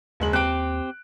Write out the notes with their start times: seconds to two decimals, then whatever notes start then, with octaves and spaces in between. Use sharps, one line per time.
0.20 F#1 D#2 G#3 F#7
0.33 C4 G4 F#6 D7